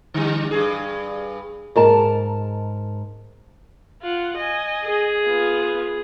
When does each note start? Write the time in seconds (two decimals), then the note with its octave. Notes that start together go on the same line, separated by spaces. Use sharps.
0.14 D3 G3
0.51 G2 G#4
1.76 G#2 A#4 A5
4.02 F4 F#5
4.38 D#5 G#5
4.84 G#4
5.26 B3 F4